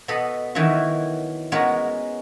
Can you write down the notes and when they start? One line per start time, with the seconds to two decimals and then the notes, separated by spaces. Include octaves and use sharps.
0.08 B2 B3 A4 D#5 B5
0.55 D#3 E3 F#3 E4 F#4
1.52 G#3 B3 C#4 F#4 A#4